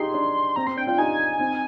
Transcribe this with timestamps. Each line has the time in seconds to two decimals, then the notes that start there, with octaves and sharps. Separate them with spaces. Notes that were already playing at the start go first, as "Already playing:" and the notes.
Already playing: D#4 F4 G4 G#4 C6
0.14 D4
0.56 C4 A#5
0.67 C4 C6
0.77 D4 G5
0.87 D4 F4 G5
0.98 D#4 G4 G#5
1.39 C4 D#4